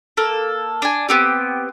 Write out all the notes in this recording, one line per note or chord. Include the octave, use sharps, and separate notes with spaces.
A#3 A4
D4 G#5
B3 C4 G4